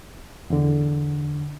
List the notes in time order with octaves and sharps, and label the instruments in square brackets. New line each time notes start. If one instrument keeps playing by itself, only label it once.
[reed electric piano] E2 D3